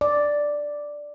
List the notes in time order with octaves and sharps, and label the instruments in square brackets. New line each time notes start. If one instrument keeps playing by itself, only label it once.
[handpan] D5